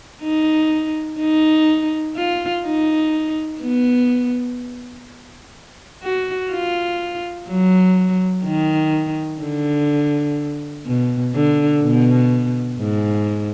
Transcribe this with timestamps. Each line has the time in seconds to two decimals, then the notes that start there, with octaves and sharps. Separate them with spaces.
0.22 D#4
1.19 D#4
2.16 F4
2.64 D#4
3.61 B3
6.03 F#4
6.51 F4
7.48 F#3
8.45 D#3
9.41 D3
10.86 B2
11.34 D3
11.83 B2
12.80 G#2